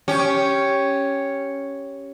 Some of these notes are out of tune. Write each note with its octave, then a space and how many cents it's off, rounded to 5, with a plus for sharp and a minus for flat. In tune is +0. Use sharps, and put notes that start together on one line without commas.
C#4 +0 G4 +0